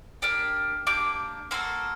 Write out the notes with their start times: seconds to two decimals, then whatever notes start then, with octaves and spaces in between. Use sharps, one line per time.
0.22 A#3 D4 G4
0.87 A#3 D4 G4 D6
1.51 A#3 F#4 A4 C6